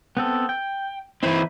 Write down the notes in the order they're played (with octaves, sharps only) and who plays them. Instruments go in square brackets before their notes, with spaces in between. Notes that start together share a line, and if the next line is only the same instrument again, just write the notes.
[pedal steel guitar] B3 C4 A4
G5
[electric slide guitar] E3 C4 [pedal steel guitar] D#4 E4 B4